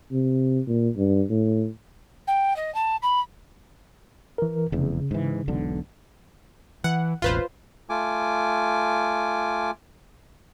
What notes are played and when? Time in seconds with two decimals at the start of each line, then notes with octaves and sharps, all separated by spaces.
0.11 C3
0.67 A#2
0.96 G2
1.29 A2
2.27 G5
2.56 D#5
2.74 A5
3.02 B5
4.38 E3 A#4
4.72 F1 E2 C#3
5.11 G#2 E3
5.48 E1 B1 D3
6.84 E3 F#5
7.22 E1 A1 F4 B4 C5
7.90 A3 F4 G#5 D6